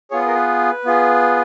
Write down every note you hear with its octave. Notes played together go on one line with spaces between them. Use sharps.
B3 F4 G#4 C#5
B4
A#4
B4
B3 F4 G#4